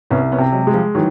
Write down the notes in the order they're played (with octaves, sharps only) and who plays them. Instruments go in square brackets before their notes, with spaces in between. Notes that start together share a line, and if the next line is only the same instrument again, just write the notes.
[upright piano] C2 [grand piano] B3 C#4
[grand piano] B3 C#4
[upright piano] C3
[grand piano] F#3 G#3
[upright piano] G#3
[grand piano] F3 G3
[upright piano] D#3 [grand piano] E3 F#3